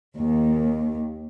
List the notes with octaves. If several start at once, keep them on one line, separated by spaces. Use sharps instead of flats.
D#2